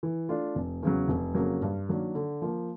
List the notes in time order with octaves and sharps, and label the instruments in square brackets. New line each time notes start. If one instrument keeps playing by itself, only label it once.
[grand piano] E3
A3 D4 F4
F1
E2 C#3 F#3
F1
F2 C#3 F#3 A#3
G2
D#3 F#3 A#3 D4
D3
F3 A#3